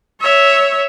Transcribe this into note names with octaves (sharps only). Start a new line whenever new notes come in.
C#5 E5